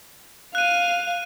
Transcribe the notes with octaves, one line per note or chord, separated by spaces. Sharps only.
F5 F#6 D#7